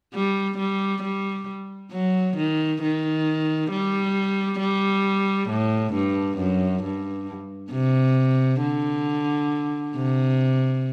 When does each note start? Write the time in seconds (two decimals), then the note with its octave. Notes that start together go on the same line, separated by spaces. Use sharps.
0.14 G3
0.58 G3
1.03 G3
1.92 F#3
2.37 D#3
2.82 D#3
3.71 G3
4.59 G3
5.50 A2
5.94 G2
6.38 F#2
6.84 G2
7.72 C3
8.61 D3
9.96 C3